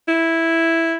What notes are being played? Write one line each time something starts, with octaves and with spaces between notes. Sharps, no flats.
E4